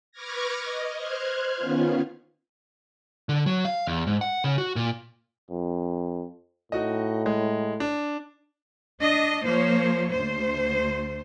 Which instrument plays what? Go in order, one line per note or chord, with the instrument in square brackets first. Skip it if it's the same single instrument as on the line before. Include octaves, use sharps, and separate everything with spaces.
[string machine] B4 C#6 D6 F6 G#6 A#6
D#5
C5 F6 F#6 G#6
D#3 B3 C#4 F4
[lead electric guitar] D3
F#3
F5
E2
G#2
F#5
C#3
F#4
A#2
[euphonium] F2
[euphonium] A2 [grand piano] D#4 F#4 D#5
[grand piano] G#3
D4
[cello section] D4 D#5
F3 A#3 C5 C#5
D2 C5